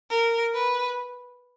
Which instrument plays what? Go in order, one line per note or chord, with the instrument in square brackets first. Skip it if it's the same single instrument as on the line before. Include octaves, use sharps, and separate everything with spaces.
[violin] A#4
B4